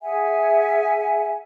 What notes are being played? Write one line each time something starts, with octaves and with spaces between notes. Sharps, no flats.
G#4 E5 F#5 G#5